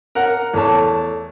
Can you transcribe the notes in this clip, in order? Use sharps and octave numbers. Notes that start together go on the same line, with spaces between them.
A#4 F#5
E2 A3 C#5 A5